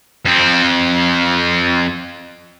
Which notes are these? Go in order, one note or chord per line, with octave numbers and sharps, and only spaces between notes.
F2 C4